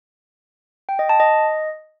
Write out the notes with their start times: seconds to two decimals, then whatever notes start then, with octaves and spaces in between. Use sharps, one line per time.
0.89 G5
0.99 D#5
1.09 A5
1.20 D#5